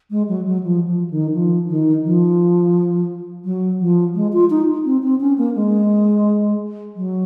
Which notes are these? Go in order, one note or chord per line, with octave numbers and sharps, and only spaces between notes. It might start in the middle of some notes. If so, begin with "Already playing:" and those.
G#3
F#3
F#3
F3
F3
D#3
F3
D#3
F3
F#3
F3
G#3
F4
D#4
C4
C4
C#4
A#3
G#3
F#3